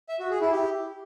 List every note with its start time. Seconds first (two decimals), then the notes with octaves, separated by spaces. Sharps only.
0.09 E5
0.19 F#4
0.30 G#4
0.41 E4
0.52 G4